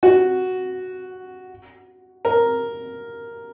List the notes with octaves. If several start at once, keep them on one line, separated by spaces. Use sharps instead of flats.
F#4
A#4